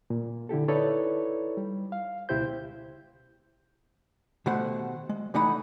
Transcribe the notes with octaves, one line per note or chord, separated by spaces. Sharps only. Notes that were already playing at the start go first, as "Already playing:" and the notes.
A#2
D3 E4 G4 A4
D#4 E4 A4 B4 C#5 D5
G3
F5
C#2 B2 E4 G4 C5 G6
B2 D#3 A3 G4 C5 F#5
G#3
C3 E3 A3 D#4 F#5 B5